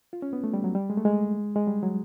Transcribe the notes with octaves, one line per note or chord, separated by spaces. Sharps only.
F4
C#4
B3
A3
G3
F#3
G3
G#3
A3
G#3
G#3
G3
F#3